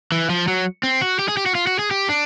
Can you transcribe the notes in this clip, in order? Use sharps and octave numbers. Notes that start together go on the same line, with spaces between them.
E3
F3
F#3
C4
F#4
G4
G#4
G4
F#4
F4
F#4
G#4
G4
D4